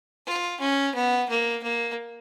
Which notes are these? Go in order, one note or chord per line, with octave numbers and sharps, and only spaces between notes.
F4
C#4
B3
A#3
A#3